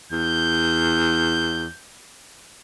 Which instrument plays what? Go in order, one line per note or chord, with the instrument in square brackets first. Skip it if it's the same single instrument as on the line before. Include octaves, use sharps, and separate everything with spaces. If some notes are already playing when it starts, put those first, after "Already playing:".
[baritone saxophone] E2 [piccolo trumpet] G6